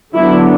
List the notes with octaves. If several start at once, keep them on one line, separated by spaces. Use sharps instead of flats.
D3 F#3 B3 D4 E4